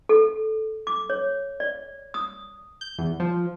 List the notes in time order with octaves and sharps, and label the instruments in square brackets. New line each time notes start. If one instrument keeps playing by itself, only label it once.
[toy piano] A4
D6
C#5
D5
D#6
[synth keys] G6
E2
F3